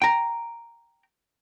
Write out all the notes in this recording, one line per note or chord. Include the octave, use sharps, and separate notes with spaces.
G5 A#5